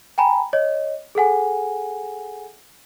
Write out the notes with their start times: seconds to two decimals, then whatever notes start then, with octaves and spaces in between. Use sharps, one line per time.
0.18 G5 G#5 A#5 B5
0.53 C#5 D#5
1.15 G#4 A4 F#5 G#5